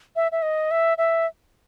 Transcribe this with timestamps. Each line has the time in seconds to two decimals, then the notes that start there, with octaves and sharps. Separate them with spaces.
0.16 E5
0.32 E5
0.42 D#5
0.71 E5
0.98 E5